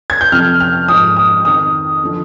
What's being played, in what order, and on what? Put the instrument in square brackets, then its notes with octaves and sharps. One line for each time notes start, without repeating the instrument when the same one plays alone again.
[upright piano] G#6
G6
F2 C3 F3 F6
F6
G#2 F3 D#6
D#6
F2 D#3 D#6
D3 F3